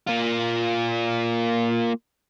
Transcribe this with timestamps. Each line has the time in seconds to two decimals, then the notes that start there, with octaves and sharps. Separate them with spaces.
0.07 A#3 F4